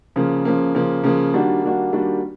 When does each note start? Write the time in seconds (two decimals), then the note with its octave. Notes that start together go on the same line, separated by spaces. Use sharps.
0.16 C#3 F3 A#3
0.45 C#3 F3 A#3
0.75 C#3 F3 A#3
1.04 C#3 F3 A#3
1.34 D#3 G3 A#3 D4 F#4
1.63 D#3 G3 A#3 D4 F#4
1.92 D#3 G3 A#3 D4 F#4